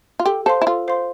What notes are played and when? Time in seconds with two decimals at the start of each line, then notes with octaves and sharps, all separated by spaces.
0.20 F4
0.26 G4 A4
0.46 A4 C5 F5 C6
0.62 E4
0.66 F4 A4
0.88 C5 F5 C6